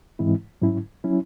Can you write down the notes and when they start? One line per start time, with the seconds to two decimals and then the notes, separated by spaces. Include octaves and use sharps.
0.19 G#2 E3 G#3 C4 E4
0.62 G#2 F#3 C#4 E4
1.04 F#3 C#4 E4